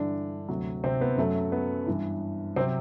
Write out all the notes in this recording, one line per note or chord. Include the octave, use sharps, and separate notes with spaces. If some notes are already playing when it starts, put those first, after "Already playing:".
Already playing: G2 D3 E3 D4
D2 C3 F#3
C3 C4
B3
F#2 F#3 A3
B3
G2 E3
C3 F#3 C4